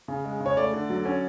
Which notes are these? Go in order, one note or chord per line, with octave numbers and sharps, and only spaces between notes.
C#3
G#3
C#3
C#5
A3 D5
D3
F#3
C#4